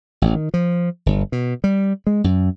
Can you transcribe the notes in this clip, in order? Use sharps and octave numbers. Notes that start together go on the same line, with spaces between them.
A1
D#3
F3
G1
B2
G3
G#3
F#2